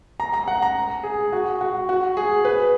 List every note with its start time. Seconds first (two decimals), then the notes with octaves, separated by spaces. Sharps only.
0.20 A#5
0.33 A#5
0.48 F#5
0.62 A#5
1.03 G#4
1.32 F#4
1.61 F#4
1.89 F#4
2.17 G#4
2.45 B4